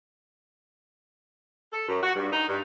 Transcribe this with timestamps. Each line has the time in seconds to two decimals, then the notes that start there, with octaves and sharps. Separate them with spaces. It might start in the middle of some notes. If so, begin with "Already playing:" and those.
1.72 A4
1.88 F#2
2.02 F#4
2.15 G2
2.31 D#4
2.48 G2